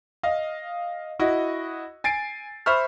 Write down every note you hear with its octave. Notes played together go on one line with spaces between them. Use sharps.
D#5 F5
E4 F#4 D#5
G#5 A6 C7 D7
C5 E5 B5 C#6 F6